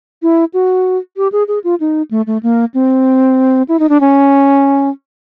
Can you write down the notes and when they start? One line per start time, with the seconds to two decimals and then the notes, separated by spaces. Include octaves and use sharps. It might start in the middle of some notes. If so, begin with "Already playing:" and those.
0.23 E4
0.54 F#4
1.17 G4
1.32 G#4
1.48 G#4
1.64 F4
1.80 D#4
2.11 A3
2.27 A3
2.43 A#3
2.74 C4
3.69 E4
3.79 D#4
3.89 D4
4.01 C#4